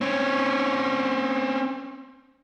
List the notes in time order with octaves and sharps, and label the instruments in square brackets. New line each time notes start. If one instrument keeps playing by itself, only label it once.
[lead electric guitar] C4 C#4